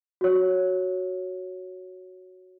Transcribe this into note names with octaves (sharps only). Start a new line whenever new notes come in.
F#4 C#5